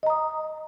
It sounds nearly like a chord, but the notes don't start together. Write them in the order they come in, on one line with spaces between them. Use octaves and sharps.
D#5 A#5 D#6